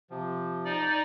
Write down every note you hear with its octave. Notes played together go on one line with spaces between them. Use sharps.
C3 F3
D#4 D5